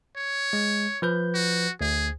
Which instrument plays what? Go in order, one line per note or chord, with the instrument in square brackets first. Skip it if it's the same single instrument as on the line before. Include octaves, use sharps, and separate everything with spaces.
[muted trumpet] C#5
[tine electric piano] G#3
F3 B4 G6
[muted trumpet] F#4
[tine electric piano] D2 [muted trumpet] G#4